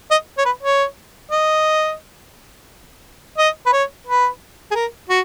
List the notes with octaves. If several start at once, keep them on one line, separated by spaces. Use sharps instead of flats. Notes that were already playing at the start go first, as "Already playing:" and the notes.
D#5
C#5
B4
C#5
D#5
D#5
B4
C#5
B4
G#4
A#4
F#4